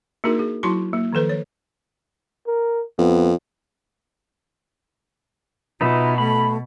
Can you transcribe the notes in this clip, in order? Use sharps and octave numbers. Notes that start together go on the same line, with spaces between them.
A#3 D4 D#4 F#4 G#4 A#4
G#4
F#3 E4 F#4 A5 C6 C#6
A#3
D#3 F3 A4 B4 C5
C#5
A#4
F2 B3
B2 D#4 F4 B4 E5
A3 B5